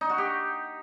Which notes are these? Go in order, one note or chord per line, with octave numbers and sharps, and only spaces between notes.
D#4
F#4
G4